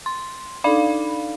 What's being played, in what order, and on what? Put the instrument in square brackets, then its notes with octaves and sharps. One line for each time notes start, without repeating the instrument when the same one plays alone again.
[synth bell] C6
[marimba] D4 D#4 A4 [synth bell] D5 F5 B5